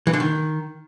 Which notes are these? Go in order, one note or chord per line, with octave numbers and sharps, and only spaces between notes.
E3
D3
D#3